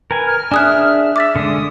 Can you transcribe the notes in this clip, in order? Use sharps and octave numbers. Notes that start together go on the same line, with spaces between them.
A#4 B4 G#5
F6
D4 G#4 E5 G#5 D#6 F#6
E5 D6 A6 B6
D3 G#3 D#6